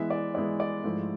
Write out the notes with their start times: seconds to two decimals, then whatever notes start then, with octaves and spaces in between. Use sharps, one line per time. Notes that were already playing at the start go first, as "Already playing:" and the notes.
Already playing: E3 G#3 B3 E4 E5
0.10 D5
0.35 E3 G#3 B3 E4 D5
0.60 D5
0.84 G#2 F3 A3 E4